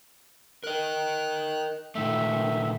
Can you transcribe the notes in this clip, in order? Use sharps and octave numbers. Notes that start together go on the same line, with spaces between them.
A#4 D#5 F#6
A#2 D#3 A3 E5